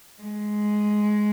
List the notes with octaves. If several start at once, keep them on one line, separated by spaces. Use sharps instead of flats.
G#3